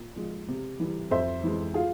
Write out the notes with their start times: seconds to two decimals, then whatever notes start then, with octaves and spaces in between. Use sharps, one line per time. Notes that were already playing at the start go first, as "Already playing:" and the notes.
Already playing: A#2
0.16 F3 G#3
0.48 C3
0.80 E3 G3
1.11 F2 C5 E5
1.44 E3 G#3
1.74 F4 G#4